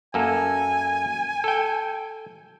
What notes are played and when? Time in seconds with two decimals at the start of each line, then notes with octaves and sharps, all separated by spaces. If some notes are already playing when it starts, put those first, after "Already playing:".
0.14 F#2 A#3 A4 G#5
1.44 A4 G5